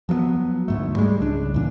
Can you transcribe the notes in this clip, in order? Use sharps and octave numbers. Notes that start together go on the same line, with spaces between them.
F3 F#3 A#3 B3
D2 G#2 A3
G3 G#3
C#2 D4
E2 A#2 D4